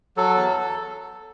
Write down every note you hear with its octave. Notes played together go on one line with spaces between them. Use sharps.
F#3 A4
E2